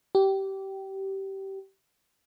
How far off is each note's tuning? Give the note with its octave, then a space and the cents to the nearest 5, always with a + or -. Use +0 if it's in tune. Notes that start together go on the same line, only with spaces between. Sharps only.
G4 -20